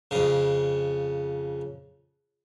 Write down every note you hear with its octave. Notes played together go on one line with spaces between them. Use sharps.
F2 C#3